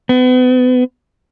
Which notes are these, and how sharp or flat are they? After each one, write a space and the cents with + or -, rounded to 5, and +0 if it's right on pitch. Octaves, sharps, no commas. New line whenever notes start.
B3 +35